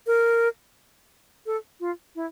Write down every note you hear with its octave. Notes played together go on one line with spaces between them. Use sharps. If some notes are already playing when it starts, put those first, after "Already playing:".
A#4
A4
F4
E4